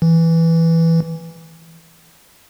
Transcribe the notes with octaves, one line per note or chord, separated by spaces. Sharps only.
E3